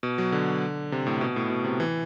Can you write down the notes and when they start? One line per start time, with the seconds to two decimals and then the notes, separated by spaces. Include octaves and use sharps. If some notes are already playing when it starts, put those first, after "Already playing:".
0.03 B2
0.18 F#3
0.32 D3
0.92 C3
1.07 A2
1.21 B2
1.36 A2
1.50 B2
1.64 C3
1.80 E3